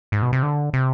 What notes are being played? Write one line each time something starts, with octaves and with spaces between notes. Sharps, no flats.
G#2
B2
C3
D3
C3